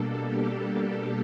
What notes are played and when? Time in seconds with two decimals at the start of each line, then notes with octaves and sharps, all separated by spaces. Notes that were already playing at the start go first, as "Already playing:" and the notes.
Already playing: B2 G3 A#3 D4 A4
0.26 G4